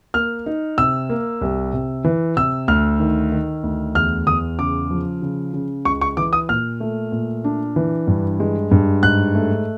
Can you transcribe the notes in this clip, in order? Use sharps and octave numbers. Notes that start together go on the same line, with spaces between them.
A#3 F6
D#4
C3 E6
A#3
C2
C3
E3
C3 E6
D2 F6
D#3
D#3
D2
E2 F6
E2 D#6
C#3 D6
F3
C#3
C#3
C#2 C#6
C#6
E3 D6
D#6
A#2 F6
A3
A#2
D4
E3
G2
G#3
G2
G#2 F#6
A3